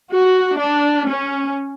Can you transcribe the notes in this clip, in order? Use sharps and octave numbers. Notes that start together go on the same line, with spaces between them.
F#4
D4
C#4